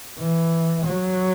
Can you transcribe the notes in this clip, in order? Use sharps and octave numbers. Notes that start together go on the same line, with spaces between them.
E3
F#3